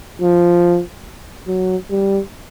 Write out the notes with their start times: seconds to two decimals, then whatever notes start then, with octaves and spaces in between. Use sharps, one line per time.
0.22 F3
1.47 F#3
1.90 G3